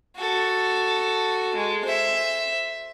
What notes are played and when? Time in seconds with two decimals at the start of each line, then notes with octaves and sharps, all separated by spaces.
0.17 F#4 A4
1.56 G#3
1.85 C5 E5